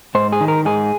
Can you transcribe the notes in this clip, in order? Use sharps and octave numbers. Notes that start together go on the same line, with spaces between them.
G#2 C5
G#4
D#3
A#4
G#2 G#4